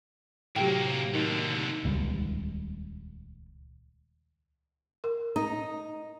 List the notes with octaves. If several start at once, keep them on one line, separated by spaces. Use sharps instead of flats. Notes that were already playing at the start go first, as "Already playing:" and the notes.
D2 A2 C3 F#3 A#3 G4 G5
D#2 D3 D#3
D#1 C#2 G3
A#4
D#4